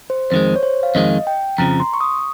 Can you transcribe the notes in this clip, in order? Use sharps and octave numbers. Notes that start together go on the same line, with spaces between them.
C5
F2 D#3 G#3 C5
C#5
C5
F5
F2 D#3 G#3 D#5
G5
F2 C#3 F3 A#5
C6
C#6
D#6